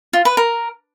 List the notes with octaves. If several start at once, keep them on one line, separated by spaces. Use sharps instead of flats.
F4
B4
A#4